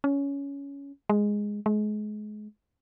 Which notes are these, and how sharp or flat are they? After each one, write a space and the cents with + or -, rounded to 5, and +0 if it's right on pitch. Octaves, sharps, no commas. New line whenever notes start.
C#4 +15
G#3 -5
G#3 +30